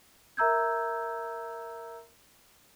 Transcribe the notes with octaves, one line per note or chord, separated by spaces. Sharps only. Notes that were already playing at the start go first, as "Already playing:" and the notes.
A#4 E5 A#5 E6 G6 G#6